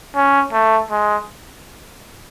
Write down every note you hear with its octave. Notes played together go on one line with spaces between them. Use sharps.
C#4
A3
G#3